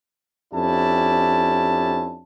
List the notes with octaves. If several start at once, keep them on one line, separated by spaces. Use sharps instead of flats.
F2 C#4 D4 E4 G4 A5